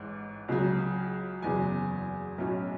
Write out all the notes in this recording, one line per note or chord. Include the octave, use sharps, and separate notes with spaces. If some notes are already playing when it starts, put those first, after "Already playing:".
Already playing: A1 G#2 E3
C#2 C#3 F#3
F#1 E2 C#3 F#3 G#5
B1 A2 F#3 C#4